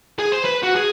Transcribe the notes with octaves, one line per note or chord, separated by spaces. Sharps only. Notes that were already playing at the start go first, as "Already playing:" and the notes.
G#4
C5 C6
B4
F#4
G#4